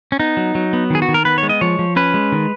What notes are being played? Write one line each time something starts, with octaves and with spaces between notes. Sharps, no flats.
C#4
B3 D#4
F#3
F#3
B3
D#3 G#4
F#4
D#3
A#4
B3 B4
C#5
G#3
D#5
F3 C#5
F3
C#4 B4
G#3
D#3